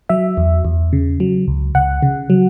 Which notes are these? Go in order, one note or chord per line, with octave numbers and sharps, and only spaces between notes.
F#3 E5
E2
E2
C#3
F#3
C#2
C#2 F#5
C#3
F#3